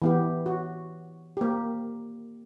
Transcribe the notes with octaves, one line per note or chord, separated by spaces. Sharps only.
E3 B3 G4
F#4
A#3 G4